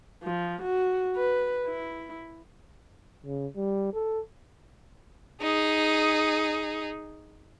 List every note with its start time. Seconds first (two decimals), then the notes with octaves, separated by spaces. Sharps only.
0.23 F3
0.62 F#4
1.16 B4
1.66 E4
3.26 C#3
3.57 G3
3.93 A4
5.41 D#4 G#4